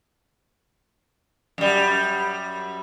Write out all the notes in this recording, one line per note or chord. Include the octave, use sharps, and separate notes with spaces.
F#2 G3